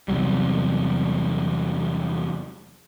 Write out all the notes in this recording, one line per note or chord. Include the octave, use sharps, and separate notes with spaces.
E2 C3 F#3 G3